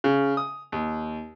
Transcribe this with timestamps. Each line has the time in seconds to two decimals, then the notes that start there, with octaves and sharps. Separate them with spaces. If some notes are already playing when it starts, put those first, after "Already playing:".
0.04 C#3
0.37 D#6
0.72 D#2